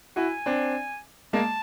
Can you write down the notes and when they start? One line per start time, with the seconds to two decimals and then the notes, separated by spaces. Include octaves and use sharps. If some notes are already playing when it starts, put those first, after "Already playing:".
0.16 E4 F#4 G#5
0.46 C4 D4
1.33 G#3 A#3 A5